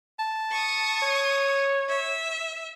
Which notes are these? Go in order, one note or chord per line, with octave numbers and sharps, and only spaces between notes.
A5
C#6 D#6
C#5
E5